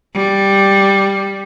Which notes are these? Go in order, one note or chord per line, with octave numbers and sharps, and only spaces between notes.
G3